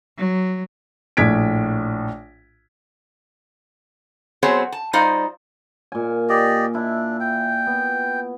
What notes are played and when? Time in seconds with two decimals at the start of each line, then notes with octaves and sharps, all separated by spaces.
0.18 F#3
1.17 A#1 A2 G#6 B6 D7
4.43 F#3 B3 C4 G#4 C5 C#5
4.72 A5
4.93 G3 D#4 F4 C5 D5 D#5
5.92 A#2 G#5
6.29 G4 D5 D#5
6.75 D4 E4 E5
7.20 G5
7.67 B3